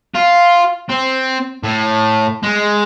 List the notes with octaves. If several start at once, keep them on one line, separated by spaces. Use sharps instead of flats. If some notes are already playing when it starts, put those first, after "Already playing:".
F4
C4
A2
G#3